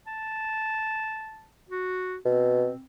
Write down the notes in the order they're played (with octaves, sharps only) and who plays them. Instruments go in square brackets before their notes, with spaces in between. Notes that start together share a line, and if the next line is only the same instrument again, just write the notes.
[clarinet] A5
F#4
[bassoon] B2 [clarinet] C4